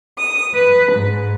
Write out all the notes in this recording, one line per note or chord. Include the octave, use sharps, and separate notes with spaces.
D#6
B4
G#2